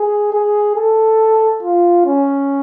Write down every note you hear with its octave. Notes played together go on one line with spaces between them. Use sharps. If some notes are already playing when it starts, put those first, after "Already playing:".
Already playing: G#4
G#4
A4
F4
C#4